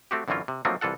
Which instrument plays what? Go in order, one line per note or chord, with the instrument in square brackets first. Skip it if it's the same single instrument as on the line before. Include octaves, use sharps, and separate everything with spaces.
[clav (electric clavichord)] A3 C4 F#4 G4
F#2 D3 E3 C4 C#4 F4
C3
F3 F#3 A3 A#3 C4 D#4
C2 E3 F4 A4 F#5